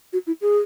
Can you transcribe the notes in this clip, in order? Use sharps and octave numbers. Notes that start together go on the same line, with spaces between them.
F#4
E4
G#4